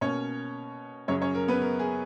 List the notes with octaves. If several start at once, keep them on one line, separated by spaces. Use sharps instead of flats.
B2 A#3 C#4 C#5
F#2 C#3 F#3 C#4 C#5
C#4 C#5
A#4
B3 B4
A#4
G#4